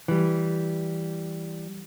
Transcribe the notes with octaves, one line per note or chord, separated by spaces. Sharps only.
E3 G3